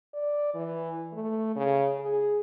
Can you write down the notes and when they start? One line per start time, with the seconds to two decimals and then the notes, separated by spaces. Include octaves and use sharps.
0.14 D5
0.55 E3
1.13 A3
1.56 C#3
1.99 G#4